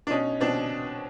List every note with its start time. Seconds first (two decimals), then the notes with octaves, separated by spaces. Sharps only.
0.07 D4
0.10 B2 C#4 D#4
0.41 B2 C4 D4